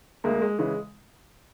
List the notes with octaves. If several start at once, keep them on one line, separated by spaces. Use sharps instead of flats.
D2 G#3 A#3
G#3
C#3 E3 G#3